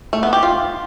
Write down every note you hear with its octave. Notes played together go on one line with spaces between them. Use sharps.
A3
B3
G4
F4